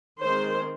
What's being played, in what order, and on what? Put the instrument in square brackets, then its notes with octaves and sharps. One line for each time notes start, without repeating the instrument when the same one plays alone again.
[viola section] D#3 G#3 C4 C5